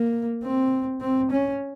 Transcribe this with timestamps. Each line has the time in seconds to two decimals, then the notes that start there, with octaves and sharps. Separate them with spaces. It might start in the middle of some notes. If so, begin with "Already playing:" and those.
Already playing: A#3
0.43 C4
1.01 C4
1.30 C#4